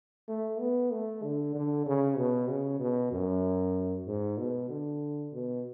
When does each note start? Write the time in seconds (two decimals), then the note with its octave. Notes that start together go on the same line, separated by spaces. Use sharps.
0.29 A3
0.60 B3
0.91 A3
1.23 D3
1.55 D3
1.86 C#3
2.17 B2
2.49 C#3
2.80 B2
3.12 F#2
4.07 G#2
4.38 B2
4.70 D3
5.33 B2